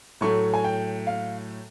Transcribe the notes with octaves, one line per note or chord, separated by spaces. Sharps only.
A2 F#3 A3 C#6
G#5
G5
F5